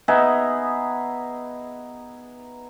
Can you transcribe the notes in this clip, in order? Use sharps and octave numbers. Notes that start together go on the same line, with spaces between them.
B3 D#4 G#4 E5